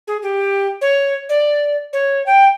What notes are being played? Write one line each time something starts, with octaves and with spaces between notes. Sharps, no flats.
G#4
G4
C#5
D5
C#5
G5